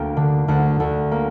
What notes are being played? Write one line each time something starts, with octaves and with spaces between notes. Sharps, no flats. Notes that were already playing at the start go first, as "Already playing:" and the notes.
Already playing: D2 A#3 G5
D3
D2 F#5
D2
A#3